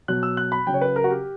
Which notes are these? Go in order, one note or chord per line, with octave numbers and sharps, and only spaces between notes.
B2 F#3 F#6
E6
F#6
B5
C#3 F#3 G5
C#5
B4
A#4
F#4
G4